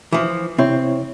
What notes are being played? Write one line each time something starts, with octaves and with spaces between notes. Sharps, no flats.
E3 F3
C3 C4 E4 C#5